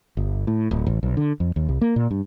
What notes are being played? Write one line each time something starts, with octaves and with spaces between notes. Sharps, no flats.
G1
A2
D1
A1
B1
D3
F2
D#2
C2
A#3
A#2
G2